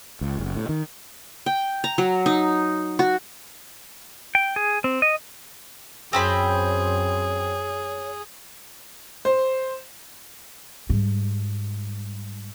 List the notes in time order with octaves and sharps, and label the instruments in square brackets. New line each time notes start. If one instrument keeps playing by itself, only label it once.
[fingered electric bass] C#2
F#1
A2
D#3
[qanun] G5
A#5
F#3
D#4
F#4
[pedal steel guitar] G5
G#4
C4
D#5
[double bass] F#2 [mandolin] C4 C5 B5 [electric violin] G#4 [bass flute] C#5
[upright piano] C5
[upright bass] G#2 G3